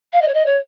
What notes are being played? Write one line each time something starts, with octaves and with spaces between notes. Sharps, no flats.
F5
D#5
C#5
D#5
C#5